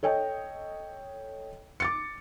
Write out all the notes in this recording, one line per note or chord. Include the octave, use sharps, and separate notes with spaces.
A4 C#5 D#5 G5
D6 A6 C#7